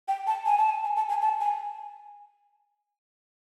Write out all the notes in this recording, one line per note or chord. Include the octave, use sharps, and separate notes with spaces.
G5
A5
G#5
A5
G#5
G#5
A5
G#5
A5
G#5